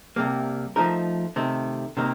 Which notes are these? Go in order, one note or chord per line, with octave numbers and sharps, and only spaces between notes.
C2 C3 G3 A#3
F3 A3 D#4 A#4
C3 D#3 A3
C3 D#3 A#3